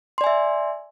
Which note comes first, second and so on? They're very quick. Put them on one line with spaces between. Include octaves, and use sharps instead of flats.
C6 D5 G#5 E5